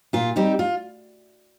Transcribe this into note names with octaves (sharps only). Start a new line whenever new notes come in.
A#2 F4
G3 C4 D#4 G4
F4